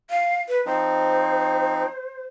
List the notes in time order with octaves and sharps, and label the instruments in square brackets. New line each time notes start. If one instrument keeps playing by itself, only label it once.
[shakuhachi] F5
B4
[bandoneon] F3 C4 D#4 [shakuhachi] C5